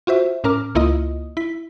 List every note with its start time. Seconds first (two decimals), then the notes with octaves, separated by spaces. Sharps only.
0.07 F4 F#4 C5 E5
0.44 A2 C#4 A#4 A#5 D6 F6
0.75 C#2 A#3 E4 F4 D#5 D#6
1.37 E4 B6